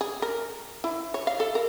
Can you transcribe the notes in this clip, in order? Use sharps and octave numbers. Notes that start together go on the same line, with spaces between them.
G#4
A#4
E4
C#5
F5
A4
A#4